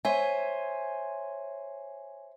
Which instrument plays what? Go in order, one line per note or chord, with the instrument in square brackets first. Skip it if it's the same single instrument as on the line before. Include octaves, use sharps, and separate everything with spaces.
[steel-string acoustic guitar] C5 E5 [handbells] C#5 G#5